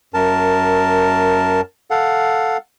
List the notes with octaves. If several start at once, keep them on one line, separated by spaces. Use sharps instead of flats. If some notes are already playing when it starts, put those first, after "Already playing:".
F#2 A#4 A5
A4 F5 F#5